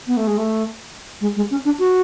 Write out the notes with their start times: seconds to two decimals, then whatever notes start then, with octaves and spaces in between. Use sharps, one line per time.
0.07 B3
0.17 A3
0.27 G#3
0.37 A3
1.21 G#3
1.36 G#3
1.51 C#4
1.65 D4
1.79 F#4